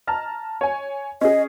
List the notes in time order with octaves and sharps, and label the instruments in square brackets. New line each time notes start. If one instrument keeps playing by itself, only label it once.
[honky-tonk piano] A5 A#5 F6
C#5 G#5
[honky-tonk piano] C#4 G#4 [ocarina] D#5